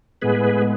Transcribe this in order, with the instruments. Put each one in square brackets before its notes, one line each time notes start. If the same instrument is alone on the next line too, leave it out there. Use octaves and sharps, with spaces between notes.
[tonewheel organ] A2 G#3 B3 G#4 B4